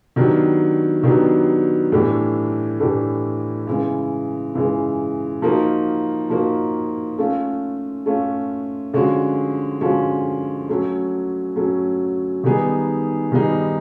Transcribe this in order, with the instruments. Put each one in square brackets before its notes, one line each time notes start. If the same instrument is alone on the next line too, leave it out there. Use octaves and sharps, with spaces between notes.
[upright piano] D#3 F#3 B3 D4 G4
D#3 F#3 B3 D4 G4
A2 E3 A3 D4 G4
A2 E3 A3 D4 G4
C#3 E3 G#3
C#3 E3 G#3
F3 A#3 D#4 F#4
F3 A#3 D#4 F#4
A3 C#4 F4
A3 C#4 F4
D3 F3 G#3 C#4 F#4
D3 F3 G#3 C#4 F#4
F#3 A3 C#4
F#3 A3 C#4
D#3 G3 B3 D#4 G#4
D#3 G3 B3 D#4 G#4